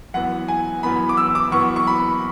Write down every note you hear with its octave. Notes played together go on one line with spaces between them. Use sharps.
F#2 E3 B3 F#5
G#5
F#2 E3 B3 B5
D6
E6
D6
F#2 E3 B3 C#6
C#6
B5